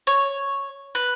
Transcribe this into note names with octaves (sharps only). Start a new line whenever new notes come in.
C#5
B4